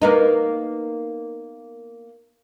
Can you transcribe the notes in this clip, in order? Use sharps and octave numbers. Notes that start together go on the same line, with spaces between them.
A#3 B3 D#4